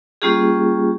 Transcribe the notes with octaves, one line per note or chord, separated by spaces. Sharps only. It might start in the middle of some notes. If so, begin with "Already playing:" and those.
G3 A#3 C#4 F4 G4 G#4